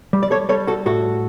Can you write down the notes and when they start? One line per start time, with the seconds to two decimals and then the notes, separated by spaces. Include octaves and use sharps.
0.13 G3
0.23 D5
0.31 A4 C#5
0.49 G3 A4 C#5
0.67 F#4 A4
0.86 A2 F#4 A4